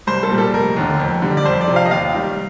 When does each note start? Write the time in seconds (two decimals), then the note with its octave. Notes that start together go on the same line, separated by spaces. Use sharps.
0.07 C2 C5
0.23 A4
0.30 A#2 G3
0.38 A4
0.54 F1 A#4
0.77 D#2 D3
0.99 F2
1.22 D3 G3
1.37 D5
1.45 F2 C5
1.61 D5
1.68 C3 F3
1.76 F5
1.85 D#5
1.91 D#2 F5
2.14 D#3 G3